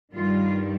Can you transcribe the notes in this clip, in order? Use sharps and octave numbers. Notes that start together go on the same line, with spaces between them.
G2 D#3 G3 F4